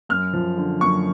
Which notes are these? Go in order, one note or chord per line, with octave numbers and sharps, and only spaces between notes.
F#2 F6
F3
D3
F#2 C#6